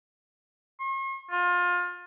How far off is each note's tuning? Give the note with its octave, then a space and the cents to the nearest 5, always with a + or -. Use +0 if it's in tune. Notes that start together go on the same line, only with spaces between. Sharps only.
C#6 -45
F4 +25